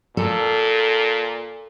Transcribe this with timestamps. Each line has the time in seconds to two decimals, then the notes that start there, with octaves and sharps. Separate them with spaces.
0.17 A#2 A4